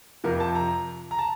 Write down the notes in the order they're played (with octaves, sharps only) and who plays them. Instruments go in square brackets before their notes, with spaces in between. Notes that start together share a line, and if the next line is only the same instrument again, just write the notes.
[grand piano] F2 C3 F3 A#4
A5
A#5
A#5
A5